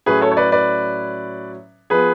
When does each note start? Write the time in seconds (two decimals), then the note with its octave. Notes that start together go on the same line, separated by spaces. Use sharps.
0.06 A2 F#3 C#4 G#4 B4
0.21 A4 C#5
0.32 C#5
0.37 B4 D5
0.52 B4 D5
1.90 F3 B3 G#4 B4